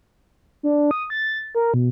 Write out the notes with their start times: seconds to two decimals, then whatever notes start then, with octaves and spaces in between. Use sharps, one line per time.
0.63 D4
0.91 D#6
1.10 A6
1.55 A#4
1.74 B2